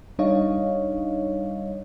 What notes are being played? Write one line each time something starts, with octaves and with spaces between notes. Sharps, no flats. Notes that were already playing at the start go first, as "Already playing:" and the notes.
G3 D4 D#4 C#5 D#5 F5